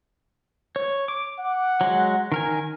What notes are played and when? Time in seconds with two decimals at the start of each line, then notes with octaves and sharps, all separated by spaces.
0.76 C#5
1.08 D6
1.39 F#5
1.81 F#3 G#3
2.32 D#3 A#4 G#5